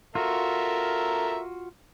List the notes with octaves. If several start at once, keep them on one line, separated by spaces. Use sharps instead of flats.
F4 F#4 A4 A#4 E5